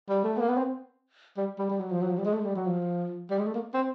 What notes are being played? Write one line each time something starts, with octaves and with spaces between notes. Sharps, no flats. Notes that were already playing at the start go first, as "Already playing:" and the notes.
G3
A3
B3
A#3
B3
C4
G3
G3
G3
F#3
F3
F#3
F3
G3
G#3
A3
G#3
G3
F#3
F3
G3
G#3
A3
A#3
C4